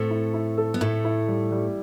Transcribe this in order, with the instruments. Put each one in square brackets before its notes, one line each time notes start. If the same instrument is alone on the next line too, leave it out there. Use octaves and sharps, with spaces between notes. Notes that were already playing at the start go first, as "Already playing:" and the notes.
Already playing: [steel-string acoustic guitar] A2 A3 [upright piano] C4
[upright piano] E4
E4
A4
[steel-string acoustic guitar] B3
[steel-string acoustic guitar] A2 A3 [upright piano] E4
[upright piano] E4
G3
G3